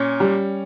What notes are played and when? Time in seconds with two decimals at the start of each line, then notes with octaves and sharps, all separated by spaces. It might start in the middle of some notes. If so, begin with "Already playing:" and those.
Already playing: A#2 C#4
0.20 G3